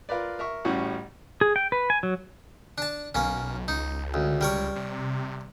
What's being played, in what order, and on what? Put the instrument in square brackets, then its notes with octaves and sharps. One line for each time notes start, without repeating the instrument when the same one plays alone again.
[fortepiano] F4 A#4 B4 D5
A#4 E5 C#6
A1 A2 G3 C#4 F#4 F#5
[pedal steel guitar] G#4
G5
B4
G#5
F#3
[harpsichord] D4 A5
[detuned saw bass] B1 [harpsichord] A#3 C#4
[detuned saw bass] C#2 [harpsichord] D#4
[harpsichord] D2
G3 A#4 C#5
[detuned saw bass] C3